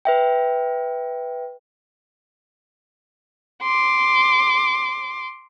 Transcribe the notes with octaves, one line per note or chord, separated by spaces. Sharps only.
B4 E5 G5
C6 D6